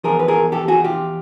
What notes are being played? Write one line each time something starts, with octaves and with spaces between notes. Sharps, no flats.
E2 C#3 F3 G#4 A#4
B4
G#4 A#4
G4 A4
F#4 G#4
F4 G4